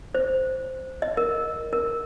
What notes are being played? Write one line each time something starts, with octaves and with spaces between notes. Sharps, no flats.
C5
D#5
A#4
A#4